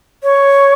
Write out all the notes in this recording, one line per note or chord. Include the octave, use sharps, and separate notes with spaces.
C#5